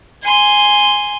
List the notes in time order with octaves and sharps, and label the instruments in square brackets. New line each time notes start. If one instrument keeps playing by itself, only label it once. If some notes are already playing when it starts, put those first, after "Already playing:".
[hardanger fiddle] G#5 C6